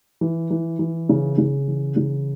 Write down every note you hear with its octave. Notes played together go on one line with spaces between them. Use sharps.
E3
E3
E3
C#3
C#3
E3
C#3